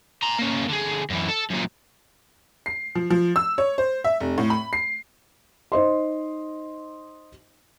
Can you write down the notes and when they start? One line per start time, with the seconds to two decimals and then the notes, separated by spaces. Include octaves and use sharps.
0.23 A#5 C6
0.39 A#3 C#4
0.69 D3 G#4
1.10 F#2 E3
1.28 A4
1.50 F#2 A#2
2.66 C7
2.95 F3
3.10 F3
3.36 E6
3.58 C#5
3.78 C5
4.04 E5
4.20 F1
4.38 A2
4.50 B5
4.73 C7
5.72 D#4 C5 D#5 C6